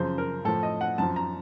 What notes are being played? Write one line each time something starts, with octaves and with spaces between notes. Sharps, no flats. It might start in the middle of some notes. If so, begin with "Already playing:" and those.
Already playing: F#2 C#3 F3 C5
A#4
A2 F3 A4
D#5
F#5
F#2 F3 A5
A#5